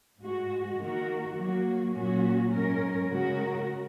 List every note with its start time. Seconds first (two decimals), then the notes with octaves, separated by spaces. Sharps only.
0.21 G#2 G#3 F#4
0.79 D#3 A#3 F#4 A#4
1.36 F#3 A#3 F#4
1.94 A#2 F#3 C#4 F#4
2.52 G#2 F#3 C#4 A#4
3.10 C#3 G#3 F#4 A#4